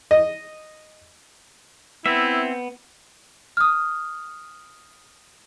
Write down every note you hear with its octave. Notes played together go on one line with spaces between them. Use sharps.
D#5
B3 C4 E4 E5
D#6 F6